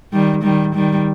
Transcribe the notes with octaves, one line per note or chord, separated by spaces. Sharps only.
D#3 G3
D#3 G3
D#3 G3